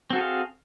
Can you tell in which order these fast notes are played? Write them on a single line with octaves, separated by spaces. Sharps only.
C4 F#4 A4 G#4 F5